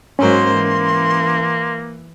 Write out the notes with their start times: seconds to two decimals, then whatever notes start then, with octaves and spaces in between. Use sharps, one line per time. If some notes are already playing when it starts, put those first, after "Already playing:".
0.19 G#2 F#3 A#3 C#4 A#4 C5 C6
0.54 E3